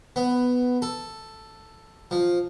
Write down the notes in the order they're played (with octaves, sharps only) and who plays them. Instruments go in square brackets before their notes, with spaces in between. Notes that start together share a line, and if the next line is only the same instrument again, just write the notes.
[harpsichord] B3
A4
F3